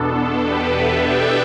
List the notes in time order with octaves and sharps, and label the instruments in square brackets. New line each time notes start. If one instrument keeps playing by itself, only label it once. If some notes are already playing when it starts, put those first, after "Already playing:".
Already playing: [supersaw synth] E2 B2 B3 D4 A4
G4 B4
B4 E5
D5 G5